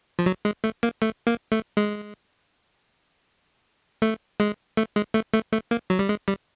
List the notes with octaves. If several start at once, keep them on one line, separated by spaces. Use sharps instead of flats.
F3
F#3
G#3
A3
A#3
A3
A#3
A3
G#3
A3
G#3
A3
G#3
A3
A3
A3
A#3
F#3
G3
G#3
G3